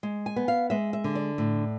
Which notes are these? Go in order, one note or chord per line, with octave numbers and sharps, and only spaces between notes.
G#3
G#5
B3
F5
G#3 E5
E5
D3
D5
A2